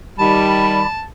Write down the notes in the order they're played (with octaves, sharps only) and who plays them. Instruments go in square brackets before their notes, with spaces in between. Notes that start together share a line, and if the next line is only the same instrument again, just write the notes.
[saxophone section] D#3 G3 [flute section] D5 B5 [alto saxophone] A5